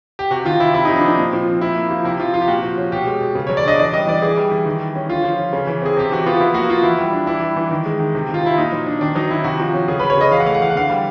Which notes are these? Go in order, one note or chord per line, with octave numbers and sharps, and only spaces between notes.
G4
C3 F#4
D#3 F4
C3 E4
C3 E4
F3 D#4
D4
C4 D#4
A#2
F3
C4
F3 E4
A#3
F3
C3 E4
F3 F4
C3 F4
G4
A#2 F#4
F3
C#4
B2 G4
G#3
B2
C#3
C#5
F#3
D5
D4 D#5
E3 D5
G3 D#5
E3 D5
E3 G#4
G3
E3
D#3
G3
C#4
D3 F4
F3
C#4
C#3
E3
C4 G#4
C3 G4
E3 F#4
B3 F4
F3 E4
A#3 F#4
F3 F4
E3 E4
G3
D4
E3 E4
G3
E3
D#3
G#3
D#3
C3
D#3
F4
C3 E4
A#2 D#4
F#3
D4
D#3 D4
F#3 D#4
D#3 E4
C3 F#4
F3
C#4
C#3 G#4
B4
F#3
C#5
C#3 D#5
E3 F5
F#5
A3 F5
F#5
E3 F5
F#5
D3 F5
G3